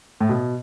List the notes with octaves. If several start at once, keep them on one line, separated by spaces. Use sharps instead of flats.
A2
B2